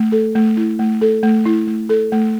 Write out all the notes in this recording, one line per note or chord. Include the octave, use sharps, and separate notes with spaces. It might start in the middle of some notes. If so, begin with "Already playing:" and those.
Already playing: A3
A4
A3
E4
A3
A4
A3
E4
A3
A4
A3